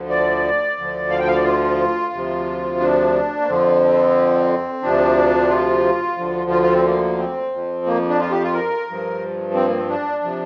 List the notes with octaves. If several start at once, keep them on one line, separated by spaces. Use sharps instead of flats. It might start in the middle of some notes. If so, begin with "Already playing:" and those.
Already playing: D2 D3 F3
D5
D2 D3 F3
F5
G5
F5
D5
F4
D2 C3 F3
D4
A#3
F2 D3 F3 C4
D2 C3 F3 D4
F4
D2 D3 F3
F4
F4
C4
A#3
C4
F2 F3
A#3
D4
F4
G4
F4
A#4
G2 F3
C4
A#3
C4
D4
C3 F3